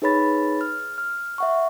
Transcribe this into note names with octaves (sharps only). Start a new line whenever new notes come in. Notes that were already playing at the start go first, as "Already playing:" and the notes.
D#4 G#4 B4 C#5 B5 A6
F6
F6
E5 F#5 C#6